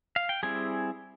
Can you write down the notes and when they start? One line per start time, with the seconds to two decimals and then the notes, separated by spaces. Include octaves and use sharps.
0.16 F5
0.29 G5
0.43 G3 C4 E4 G#4 G#5